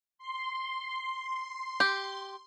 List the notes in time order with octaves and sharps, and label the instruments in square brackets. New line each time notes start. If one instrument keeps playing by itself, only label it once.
[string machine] C6
[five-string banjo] G4